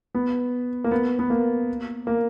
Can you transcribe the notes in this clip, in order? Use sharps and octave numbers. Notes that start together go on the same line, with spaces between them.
B3
A#3
B3
B3
A#3
A#3